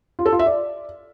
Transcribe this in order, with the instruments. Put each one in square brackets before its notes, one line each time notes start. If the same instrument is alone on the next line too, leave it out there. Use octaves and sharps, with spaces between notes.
[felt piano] F4
A4
F4
E5
D5